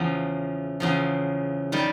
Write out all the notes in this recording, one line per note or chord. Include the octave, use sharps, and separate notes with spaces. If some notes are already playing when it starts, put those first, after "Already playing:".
Already playing: E2 C#3 F3
E2 C#3 F3
D#3 G3